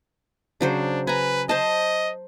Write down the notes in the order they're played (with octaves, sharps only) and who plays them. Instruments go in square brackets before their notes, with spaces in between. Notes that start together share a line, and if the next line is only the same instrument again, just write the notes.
[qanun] C#3 F#3 C5 [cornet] D4
[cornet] B4 [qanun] G#5 A#5
[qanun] C5 A5 [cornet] D#5